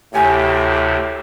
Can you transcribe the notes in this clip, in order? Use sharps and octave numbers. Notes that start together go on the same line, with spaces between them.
D2 A2 C3 G4 C#5 G#5